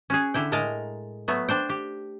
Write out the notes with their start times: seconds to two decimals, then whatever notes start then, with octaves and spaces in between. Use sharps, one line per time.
0.10 C#4 F#4 G#4
0.34 D3 E4 G5
0.52 A2 G#3 A#4 D#5 A5 A#5
1.28 F#3 A3 B3
1.49 D4 C5 G5
1.69 G4